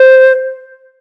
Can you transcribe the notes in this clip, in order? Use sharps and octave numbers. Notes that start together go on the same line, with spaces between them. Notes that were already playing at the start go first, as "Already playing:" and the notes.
Already playing: C5